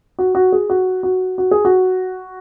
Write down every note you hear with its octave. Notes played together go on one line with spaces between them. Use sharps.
F#4
F#4
G#4
F#4
F#4
F#4
G#4
F#4